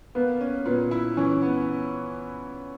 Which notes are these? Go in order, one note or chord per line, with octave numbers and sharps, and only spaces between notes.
A#3 B3
C#4
A#2 B3
E4
E3 C#4
B3